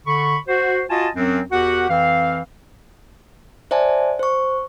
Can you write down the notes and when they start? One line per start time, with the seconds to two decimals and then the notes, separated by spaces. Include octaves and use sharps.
0.07 D3 B5 C#6
0.48 F#4 C5
0.90 F4 F#4 D#5 G#5 A5
1.15 F#2 F#3 C4
1.52 E2 F#4 G4 A#4 F#5
1.90 F2 E3 C4 F5
3.71 C5 D5 E5 G#5 A5
4.19 C5 C#6